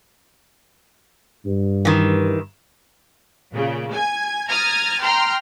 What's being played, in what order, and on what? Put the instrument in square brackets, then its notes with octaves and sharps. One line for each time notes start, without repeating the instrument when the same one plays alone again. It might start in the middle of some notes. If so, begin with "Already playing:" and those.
[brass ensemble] G2
[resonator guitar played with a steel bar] D#3 E3
[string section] A#2 C#3
G#5 G#6
A#5 D#6 F6 G#6 A6
G5 A#5 C6 F6